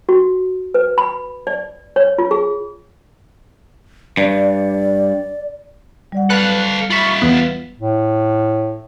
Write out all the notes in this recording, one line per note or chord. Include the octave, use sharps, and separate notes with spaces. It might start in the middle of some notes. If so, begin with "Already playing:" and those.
F#4
B4
B5
D5
C#5
F4
G#4
G2 D5
G3 D5 F#5
A4 B4 F5 F#6
F4 E5 B5 C#6
E2 B3
A2